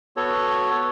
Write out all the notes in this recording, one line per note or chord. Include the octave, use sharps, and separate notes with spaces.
B3 F#4 A4 C#5